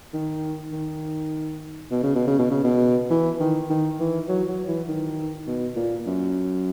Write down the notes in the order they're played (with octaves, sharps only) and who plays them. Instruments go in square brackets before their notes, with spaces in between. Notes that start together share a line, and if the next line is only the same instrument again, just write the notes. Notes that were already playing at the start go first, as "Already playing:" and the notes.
[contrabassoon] D#3
D#3
B2
C#3
B2
C#3
B2
C#3
B2
E3
D#3
D#3
E3
F#3
F#3
E3
D#3
B2
A#2
F#2